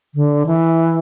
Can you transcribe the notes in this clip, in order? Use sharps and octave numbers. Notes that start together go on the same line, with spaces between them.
D3
E3